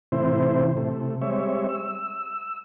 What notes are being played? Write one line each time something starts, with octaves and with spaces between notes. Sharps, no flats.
A2 C3 E3 C4 E4 C5
C3 A3
G3 G#3 C4 C#5 E5
E6